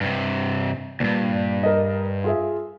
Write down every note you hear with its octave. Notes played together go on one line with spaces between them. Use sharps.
G2 C3
D2 G2 A#2
A#4 D#5
F4 G#4 E5